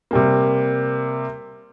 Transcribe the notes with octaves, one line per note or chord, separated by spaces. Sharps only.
C3 G3 A#3